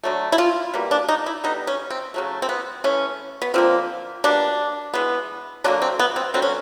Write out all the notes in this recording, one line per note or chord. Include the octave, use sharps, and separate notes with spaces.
D3 F#3 A3
E4
F4
B2 G3 A#3
D4
D#4
E4
D3 G3 B3 D#4
C#4
C4
C#3 F#3 A3
C4
B3
E3 A3 C#4
B3
D3 F3 A#3 C4
B2 G3 A#3 D4
E3 G#3 B3
D3 F#3 A#3 D4
C4
B3
C4
D3 F#3 B3 C4
C#4